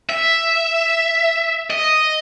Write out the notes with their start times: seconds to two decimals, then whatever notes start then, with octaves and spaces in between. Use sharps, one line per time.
0.09 E5
1.70 D#5